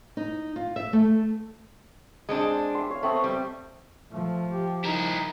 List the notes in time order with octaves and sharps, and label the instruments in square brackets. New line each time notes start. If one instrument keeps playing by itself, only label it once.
[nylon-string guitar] D#4
F4
E5
A3
[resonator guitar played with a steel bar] G#3 C4 D4
[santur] E5 C6
C#5 F5
[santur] A3 C4 D#5 [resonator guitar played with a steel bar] B3
[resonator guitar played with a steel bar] G3
[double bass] F3 [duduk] A3
[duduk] G4
[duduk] D#4 [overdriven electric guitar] E4 A#4